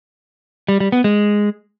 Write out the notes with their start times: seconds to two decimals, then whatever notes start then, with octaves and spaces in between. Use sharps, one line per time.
0.68 G3
0.80 G3
0.92 B3
1.04 G#3